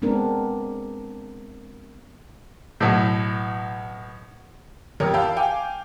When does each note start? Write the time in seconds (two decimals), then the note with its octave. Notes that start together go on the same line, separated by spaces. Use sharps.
0.02 G#3 B3 C4 D4 A#4
2.80 B1 A2
5.00 A1 F2 G4 A#4 C#5
5.14 F5 G5 A5 B5 E6
5.36 F5 G5 G#5 D6